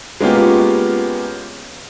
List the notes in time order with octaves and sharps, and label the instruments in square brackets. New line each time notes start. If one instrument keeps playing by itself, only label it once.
[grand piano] G#3 A#3 B3 C#4 F4 G4